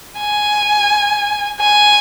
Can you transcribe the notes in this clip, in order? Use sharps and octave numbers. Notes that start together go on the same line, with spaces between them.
G#5
G#5